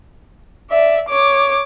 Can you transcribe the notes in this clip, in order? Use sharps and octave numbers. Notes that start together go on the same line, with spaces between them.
D5 E5
C#5 D6